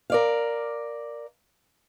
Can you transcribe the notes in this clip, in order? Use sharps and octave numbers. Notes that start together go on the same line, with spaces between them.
A#4 D5 F5